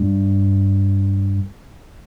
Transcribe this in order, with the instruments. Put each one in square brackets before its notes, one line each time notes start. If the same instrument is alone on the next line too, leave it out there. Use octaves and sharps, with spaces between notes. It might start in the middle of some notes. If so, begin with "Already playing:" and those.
Already playing: [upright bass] G2